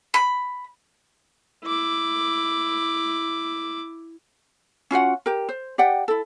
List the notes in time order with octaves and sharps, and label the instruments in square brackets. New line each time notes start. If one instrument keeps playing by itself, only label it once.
[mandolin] B5
[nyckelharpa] E4 D6
[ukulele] C#4 F4 F#4 F#5
G4 A#4
C5
G4 D5 F#5 G5
E4 A4